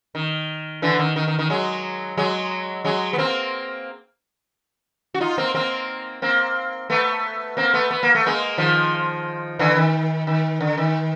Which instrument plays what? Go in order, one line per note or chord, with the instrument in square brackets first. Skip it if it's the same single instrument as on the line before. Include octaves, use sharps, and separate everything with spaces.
[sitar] D#3
D3 E3
D#3
D#3
D#3
D#3
F#3 G#3
F#3 G#3
F#3 G#3
B3
A#3 C4
F#4
D#4 F4
A#3 C4
A#3 C4
A#3 C4
A3 B3
A#3 C4
A3 B3
B3
A#3
A3
G#3 A#3
D#3 F3
D3 E3
D#3
D#3
D3
D#3